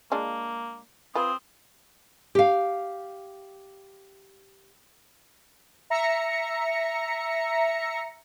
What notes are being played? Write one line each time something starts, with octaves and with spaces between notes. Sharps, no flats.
G#3 A#3 D4 F4
C4 F4 B4 D#6
G4 F5
E5 A#5 A#6 C#7